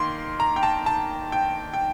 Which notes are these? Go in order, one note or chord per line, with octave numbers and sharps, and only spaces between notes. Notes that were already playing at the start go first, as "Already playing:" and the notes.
Already playing: D#3 A#3 C6
A#5
G5
A5
A5
G5
G5